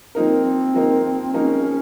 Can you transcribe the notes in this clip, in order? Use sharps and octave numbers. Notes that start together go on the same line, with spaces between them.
F3 A#3 C4 D#4 A#4
F3 A#3 D#4 A#4
F3 A#3 C#4 D#4 A#4